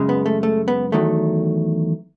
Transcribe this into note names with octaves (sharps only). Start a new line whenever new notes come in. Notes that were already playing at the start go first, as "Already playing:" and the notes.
Already playing: F#2 C#3 G#3
B3
A3
A3
B3
E2 D#3 F#3 A3